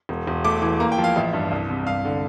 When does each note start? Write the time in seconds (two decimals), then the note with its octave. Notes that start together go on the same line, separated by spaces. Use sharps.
0.09 E1
0.27 E1
0.44 A3 D6
0.62 E3
0.80 A#3 A#5
0.92 G5
0.98 F3
1.04 F5
1.16 A1 E5
1.33 G2
1.51 C2
1.69 C3
1.87 G2 F5
2.05 D3